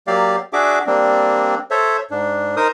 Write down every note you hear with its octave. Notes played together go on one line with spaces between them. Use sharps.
F#3 A#3 G4 D5 F5
D4 F#4 G#4 E5 D6
G3 A#3 C4 D4
A4 C5 C#5 E5
G#2 D4
D#4 A#4 C5 D#6